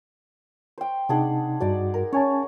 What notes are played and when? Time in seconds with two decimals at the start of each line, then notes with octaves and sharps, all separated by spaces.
0.78 C5 G5
1.09 C3 D4 D#4 G#4 F#5
1.60 G2 D#4 F#4 D5 F#5
1.94 A#4
2.13 C#4 C#5 G#5 A5